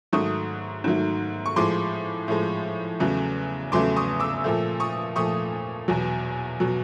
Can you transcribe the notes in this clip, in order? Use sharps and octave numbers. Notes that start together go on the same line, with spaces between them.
G#2 D#3 F#3 A3 C#6 D#6
G#2 D#3 F#3 A3
C#6
A2 F3 G#3 C6 D6
A2 F3 G#3
E2 C#3 F#3 A3
E2 C#3 F#3 A3 C6 D6
C#6 D#6
D6 E6
A#2 F3 A3
C#6 D#6
A#2 F3 A3 C#6 D#6
E2 B2 F#3
B2 F#3